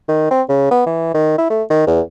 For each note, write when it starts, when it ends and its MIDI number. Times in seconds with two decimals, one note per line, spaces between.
0.08 0.27 51
0.31 0.42 60
0.49 0.68 49
0.71 0.82 59
0.86 1.13 52
1.14 1.33 51
1.38 1.49 64
1.50 1.63 57
1.70 1.82 51
1.87 2.00 40